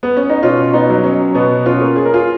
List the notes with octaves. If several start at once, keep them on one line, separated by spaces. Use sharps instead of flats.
B3
C#4
D#4
B2 C#4 F4
B3 D#4
F#3
C#4
B2 B3
C#4 F4
A#3
G#4
A#4
F4 G#4